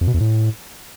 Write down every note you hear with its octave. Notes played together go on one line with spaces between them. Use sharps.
F2
B2
E2
A2